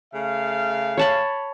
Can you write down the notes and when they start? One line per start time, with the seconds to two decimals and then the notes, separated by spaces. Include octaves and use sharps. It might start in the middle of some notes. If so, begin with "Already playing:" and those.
0.14 C#3 A3 F5
0.97 C#5 A5 B5